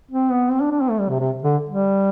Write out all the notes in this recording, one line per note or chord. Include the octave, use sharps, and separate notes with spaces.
C4
B3
C4
D4
D4
C4
A3
G3
C3
C3
D3
G3